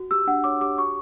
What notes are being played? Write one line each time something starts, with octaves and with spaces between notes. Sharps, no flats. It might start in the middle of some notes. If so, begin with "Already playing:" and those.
Already playing: F#4
G4 E6
D4 F#5
C#5 D6
G4 D6
F#4 C#6